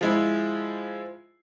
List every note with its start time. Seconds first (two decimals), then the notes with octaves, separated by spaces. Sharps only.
0.01 F3 G#3 E4